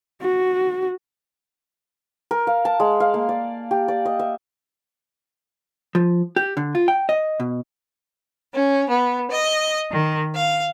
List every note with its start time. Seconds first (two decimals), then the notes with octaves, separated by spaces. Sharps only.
0.22 F#4
2.31 A#4
2.47 F5
2.65 A5
2.80 G#3
3.00 F5
3.14 A#3
3.29 D5
3.71 G4
3.88 D5
4.05 D#5
4.19 E5
5.95 F3
6.36 G4
6.57 D3
6.75 F4
6.88 G5
7.09 D#5
7.40 B2
8.53 C#4
8.89 B3
9.31 D#5
9.92 D#3
10.35 F5